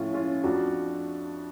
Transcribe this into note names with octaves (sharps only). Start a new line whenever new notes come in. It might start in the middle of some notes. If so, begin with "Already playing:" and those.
Already playing: A2 F3 C#4 F4
C#4 F4
F2 F3 D4 F#4